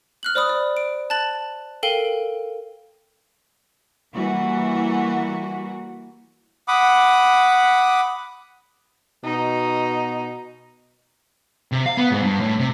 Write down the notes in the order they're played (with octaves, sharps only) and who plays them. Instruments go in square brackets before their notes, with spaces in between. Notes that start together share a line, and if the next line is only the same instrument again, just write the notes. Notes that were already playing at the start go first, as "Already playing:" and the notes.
[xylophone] F6 F#6 F#7
C5 D5 B5 D#6 F#6
D5
D7
A5 F#6 A6 F#7
A4 A#4 F5 G5 D#7 G7
[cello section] E3 G3 A#3 F#4
[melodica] F#5 B5 D6 D#6
[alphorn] B2 [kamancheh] D#4
[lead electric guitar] C3
F5
B3
G#2
G2
A2
C3